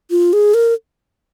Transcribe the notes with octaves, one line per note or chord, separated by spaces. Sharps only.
F4
G#4
A#4